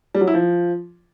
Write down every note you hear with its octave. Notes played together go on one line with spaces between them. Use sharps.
G3
F#3
E4
F3